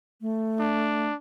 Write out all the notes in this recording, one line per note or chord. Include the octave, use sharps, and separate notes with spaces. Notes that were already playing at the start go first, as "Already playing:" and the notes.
A3
D4